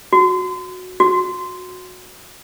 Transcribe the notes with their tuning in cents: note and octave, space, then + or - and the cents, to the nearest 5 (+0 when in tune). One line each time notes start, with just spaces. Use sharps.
F#4 -10
F#4 -20